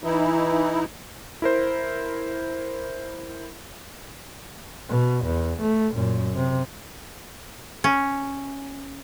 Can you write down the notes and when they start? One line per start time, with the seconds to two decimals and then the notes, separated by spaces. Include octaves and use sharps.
0.04 E3 D#4 E4
1.42 E4 A#4 C5
4.88 B2
5.25 E2
5.61 A3
5.94 F#2 A#2
6.35 C3
7.84 C#4